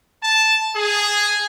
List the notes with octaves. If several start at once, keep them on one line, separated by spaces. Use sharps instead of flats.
A5
G#4